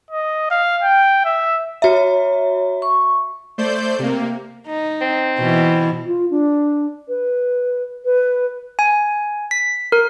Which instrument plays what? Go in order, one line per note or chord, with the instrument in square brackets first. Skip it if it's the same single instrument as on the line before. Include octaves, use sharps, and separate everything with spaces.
[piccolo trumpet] D#5
F5
G5
E5
[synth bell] F#4 E5 [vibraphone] C#5 A#5
[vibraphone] C#6
[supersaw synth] A3 C5 D5 G6
C3 A#3
[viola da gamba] D#4
[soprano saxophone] C4
[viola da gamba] B2 E3 E4
[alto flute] F4
D4
B4
B4
[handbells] G#5
B6
A#4